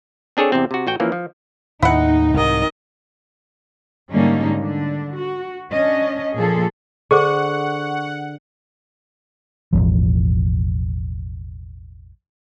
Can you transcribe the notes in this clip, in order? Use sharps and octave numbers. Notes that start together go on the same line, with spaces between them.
C4 D4 G#4 A4 C#5
E2 C3 C4
C3 F#4
A1 F#4 G5
E3 F3 A#3 C#4
F3
D#2 A2 D#3 D#4 E4 F#5
C2 G#2 D#3 D#5
G#2 D3 G3 A#3 C#4 D#4
D3 D4
F#4
C#4 D4 D#5
A#2 F3 G#4 A4
D3 G#4 C5 F#5 C#6 D6
E1 A1 D#2 F3